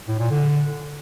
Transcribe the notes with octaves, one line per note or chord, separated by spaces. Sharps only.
A2
A#2
D3